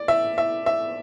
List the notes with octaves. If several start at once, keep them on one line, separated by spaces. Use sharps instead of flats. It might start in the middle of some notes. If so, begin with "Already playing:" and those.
Already playing: D5
E5
E5
E5